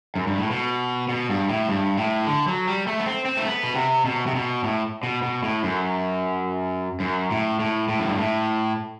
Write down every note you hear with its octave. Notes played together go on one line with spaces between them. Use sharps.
F#2
G2
A2
B2
B2
G2
A2
G2
A2
D3
F#3
G3
A3
B3
C4
C4
A3
B3
B2
C3
B2
C3
B2
A2
B2
B2
A2
F#2
F#2
A2
A2
A2
F#2
G2
A2